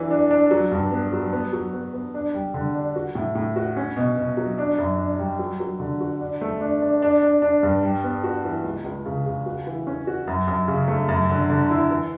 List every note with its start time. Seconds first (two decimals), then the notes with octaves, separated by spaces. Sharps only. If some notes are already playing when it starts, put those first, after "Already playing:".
Already playing: E3 F#3 D4
0.11 D4
0.31 D4
0.51 F#3
0.71 G2
0.92 B3
1.13 F#3
1.33 B3
1.53 F#3
1.73 B3
1.94 B3
2.14 D4
2.34 G3
2.54 D3
2.74 D4
2.96 F#4
3.15 A2
3.35 A2
3.56 F#4
3.77 C#4
3.97 B2
4.17 B2
4.37 F#3
4.58 D4
4.78 F#2
4.98 D4
5.19 G3
5.39 F#3
5.60 F#3
5.80 D3
6.01 F#4
6.21 D4
6.41 A3
6.61 D4
6.82 D4
7.02 D4
7.23 D4
7.42 D4
7.63 G2
7.83 G3
8.04 B3
8.24 F#4
8.44 E3
8.64 C#2
8.84 C#2
9.06 C#3
9.26 C#3
9.46 F#4
9.67 E3
9.87 C#4
10.07 F#4
10.27 F#2
10.48 F#2
10.68 C#3
10.88 A3
11.08 F#2
11.30 D3
11.50 D3
11.70 E4
11.91 E3